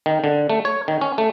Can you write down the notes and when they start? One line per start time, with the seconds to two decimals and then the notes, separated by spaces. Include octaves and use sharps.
0.06 D#3
0.24 D3
0.50 A3
0.65 C#5
0.88 D#3
1.01 C#4
1.18 A3